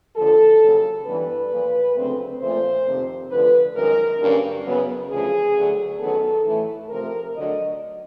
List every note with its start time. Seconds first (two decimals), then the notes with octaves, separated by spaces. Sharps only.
0.16 D#2 D3 F3 A4
0.61 D#2 C#3 F#3
1.06 G2 E3 G3 B3 B4
1.51 A#2 F3 A#3
1.96 D2 C#3 F#3 A3 C4
2.40 A#2 F3 A3 C5
2.86 F2 C3 D#3
3.30 D2 D3 F3 B4
3.75 F#2 D#3 G#3 A#4
4.20 G2 D3 F#3 A#3 C#4
4.66 F#2 C#3 F#3 B3
5.09 D2 C#3 F3 G#4
5.55 D2 D3 F#3
6.00 F#2 D#3 F#3 B3 A4
6.45 A2 E3 A3
6.89 C3 F3 A3 A#4
7.34 D2 D3 F#3 D#5